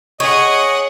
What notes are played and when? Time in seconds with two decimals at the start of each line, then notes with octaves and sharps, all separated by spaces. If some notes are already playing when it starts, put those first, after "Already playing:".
0.20 G#4 C#5 D#5 F#5